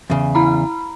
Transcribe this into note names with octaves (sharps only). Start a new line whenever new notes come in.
E2 C#3
E4 A#5 B5